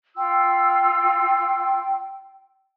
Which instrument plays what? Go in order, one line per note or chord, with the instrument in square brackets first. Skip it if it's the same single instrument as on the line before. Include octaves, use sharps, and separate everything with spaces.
[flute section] F4 C6 E6 [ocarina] G5